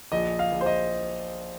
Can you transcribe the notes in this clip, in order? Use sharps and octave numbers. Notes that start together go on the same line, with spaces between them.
A#1 D#5
F5
A#1
C5
D#5